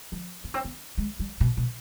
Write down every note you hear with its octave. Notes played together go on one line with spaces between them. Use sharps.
F3
B3
C4
B3
G#3
G3
B2
B2